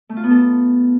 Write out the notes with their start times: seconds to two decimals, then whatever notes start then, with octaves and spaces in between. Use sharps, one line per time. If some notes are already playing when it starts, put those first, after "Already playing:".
0.09 A3
0.17 F4
0.24 B3
0.31 A4